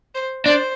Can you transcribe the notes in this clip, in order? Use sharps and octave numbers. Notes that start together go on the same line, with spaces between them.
C5
D4 C5